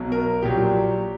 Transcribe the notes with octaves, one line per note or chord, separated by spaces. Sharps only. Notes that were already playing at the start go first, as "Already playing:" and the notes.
Already playing: B1 B2 F#3
A#4
A#1 A#2 F#3 G4